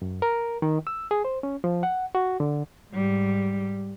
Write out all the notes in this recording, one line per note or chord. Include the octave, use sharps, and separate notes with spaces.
F#2
A#4
D#3
E6
G#4
C5
C#4
F3
F#5
F#4
D3
G#2 G3